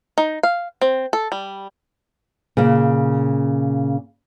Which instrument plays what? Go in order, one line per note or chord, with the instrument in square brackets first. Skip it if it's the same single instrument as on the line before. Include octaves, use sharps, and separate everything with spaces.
[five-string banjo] D#4
F5
C4
A4
G3
[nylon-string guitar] A#2 C#3